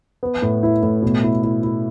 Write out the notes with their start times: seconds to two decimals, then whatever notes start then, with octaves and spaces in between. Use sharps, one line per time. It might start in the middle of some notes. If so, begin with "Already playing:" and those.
0.23 B3
0.42 A2
0.63 E4
0.83 A2
1.02 B2
1.23 E4
1.43 E4
1.63 E4